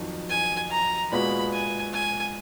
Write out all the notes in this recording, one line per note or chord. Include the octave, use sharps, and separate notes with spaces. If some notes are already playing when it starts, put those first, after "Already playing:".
Already playing: F2 D#3 F#3
G#5
A#5
A#2 G#3 B3 F#4 B5
G#5
G#5